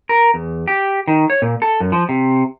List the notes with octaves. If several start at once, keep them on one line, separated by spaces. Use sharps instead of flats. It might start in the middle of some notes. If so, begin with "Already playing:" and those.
A#4
E2
G4
D#3
C#5
A#2
A4
F#2
F3
C3